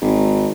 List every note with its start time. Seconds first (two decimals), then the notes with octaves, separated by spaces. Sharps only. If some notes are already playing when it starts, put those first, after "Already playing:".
0.01 G#1